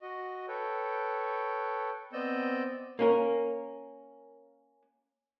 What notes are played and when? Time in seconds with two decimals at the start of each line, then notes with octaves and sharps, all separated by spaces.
0.01 F#4 D#5
0.48 A4 B4 C#5 G5
2.13 B3 C4 D5 D#5 E6 G6
2.99 A#3 C#4 A#4